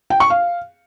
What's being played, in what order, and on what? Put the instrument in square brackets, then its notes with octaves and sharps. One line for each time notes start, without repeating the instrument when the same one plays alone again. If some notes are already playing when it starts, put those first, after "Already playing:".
[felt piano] G5
C#6
F5